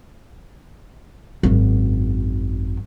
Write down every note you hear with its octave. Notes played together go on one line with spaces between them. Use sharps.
G#1 F#2